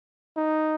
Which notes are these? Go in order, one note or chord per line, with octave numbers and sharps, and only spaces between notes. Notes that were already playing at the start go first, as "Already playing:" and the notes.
D#4